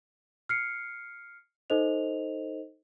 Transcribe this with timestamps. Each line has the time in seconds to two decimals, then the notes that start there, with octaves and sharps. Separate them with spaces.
0.49 F6 C7 C#7
1.70 D#4 A4 C5 D#5 F7